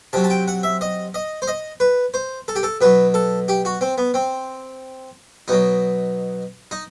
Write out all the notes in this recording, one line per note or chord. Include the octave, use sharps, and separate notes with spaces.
C3 F#3 A5
A5
G5
F#5
E5
D#5
D#5
C5
D#5
B4
C5
A4
G4
A4
B2 F#3 B4
A4
G4
F#4
C4
B3
C4
B2 F#3 D#4
D#4